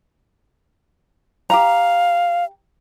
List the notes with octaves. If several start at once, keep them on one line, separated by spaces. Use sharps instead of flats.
G4 F5 A#5